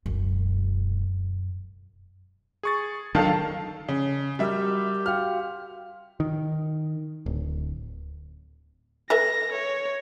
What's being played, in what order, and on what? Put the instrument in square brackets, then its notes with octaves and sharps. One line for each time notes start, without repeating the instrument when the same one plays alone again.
[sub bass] E1 [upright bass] B1 F#2
[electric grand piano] G#4 C#6 A6
[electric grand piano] D#3 [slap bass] F#3 D4 [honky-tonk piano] A4 F5 A5
[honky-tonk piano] C#3
[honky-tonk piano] G3 E5 [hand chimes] F#4 A#4 F6 [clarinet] G4
[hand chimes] F#4 F5 G5 [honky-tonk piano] F6
[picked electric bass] D#3
D1
[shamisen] A4 B4 E5 [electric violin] A#6
[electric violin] C#5